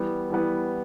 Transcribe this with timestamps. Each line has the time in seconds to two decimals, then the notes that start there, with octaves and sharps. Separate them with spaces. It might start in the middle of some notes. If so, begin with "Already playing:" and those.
Already playing: E3 G3 B3
0.30 E3 G3 B3